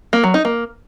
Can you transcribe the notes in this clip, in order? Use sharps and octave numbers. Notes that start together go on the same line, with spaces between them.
A#3
F#3
D#4
A#3